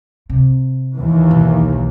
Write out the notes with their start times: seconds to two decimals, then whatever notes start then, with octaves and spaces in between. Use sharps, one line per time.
0.29 C3
0.94 D#2 E3
1.31 B1